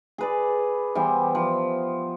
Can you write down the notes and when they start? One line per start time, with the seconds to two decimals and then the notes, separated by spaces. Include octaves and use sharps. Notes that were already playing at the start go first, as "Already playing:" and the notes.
0.18 G#4 B4 D5
0.95 E3 G3 B3 C5
1.35 F3